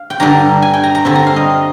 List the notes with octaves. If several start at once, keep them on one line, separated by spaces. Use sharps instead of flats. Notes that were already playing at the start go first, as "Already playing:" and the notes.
Already playing: F5
G5
G2 D3 G3 D4 A#5
G#5
G5
A#5
A#5
D3 G3 C4 A#5
A#5
F5
D#5